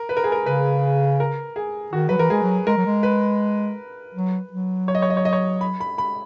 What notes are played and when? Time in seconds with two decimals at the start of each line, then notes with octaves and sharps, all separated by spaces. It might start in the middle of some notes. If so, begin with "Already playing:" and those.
Already playing: A#4
0.09 B4
0.17 A#4
0.24 G#4
0.32 A#4
0.46 C#3 B4
1.20 A#4
1.56 G#4
1.93 D#3 F#4
2.09 F#3 B4
2.17 E3 A#4
2.30 G#3 G#4
2.42 F#3
2.67 G#3 A#4
2.77 F#3
2.86 G#3
3.03 B4
4.14 F#3
4.51 F#3
4.88 C#5
4.95 D#5
5.02 C#5
5.10 D#5
5.17 C#5
5.25 D#5
5.33 C#5
5.61 B5
5.80 B5
5.98 B5